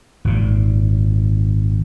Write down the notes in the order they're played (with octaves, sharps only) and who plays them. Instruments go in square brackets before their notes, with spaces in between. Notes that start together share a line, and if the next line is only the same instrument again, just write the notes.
[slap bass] G#1 A#2